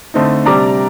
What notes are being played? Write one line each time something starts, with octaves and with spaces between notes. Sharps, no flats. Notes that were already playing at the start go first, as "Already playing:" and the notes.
D3 A3 C4 D#4
C3 G3 D4 A#5 D6